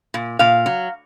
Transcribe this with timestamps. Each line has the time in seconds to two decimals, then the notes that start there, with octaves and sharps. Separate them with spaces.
0.14 A#2
0.39 A#2 F5
0.66 F#3